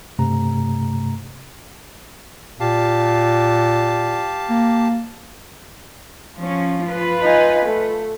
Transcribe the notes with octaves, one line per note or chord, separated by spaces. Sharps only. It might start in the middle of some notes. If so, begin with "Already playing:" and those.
G2 C3 A3 A#5
A#2 G4 F5 A5
A#3
F3 C#4
F4 B4
D#4 G#5
A3